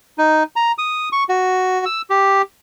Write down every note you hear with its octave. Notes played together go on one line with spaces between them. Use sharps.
D#4
A#5
D#6
C#6
F#4
E6
G4